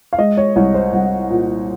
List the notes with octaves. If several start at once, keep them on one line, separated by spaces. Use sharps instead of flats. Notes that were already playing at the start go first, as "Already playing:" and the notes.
F5
G#3 D#5
C#5
C2 C#5
C5
C2 F#5
A#2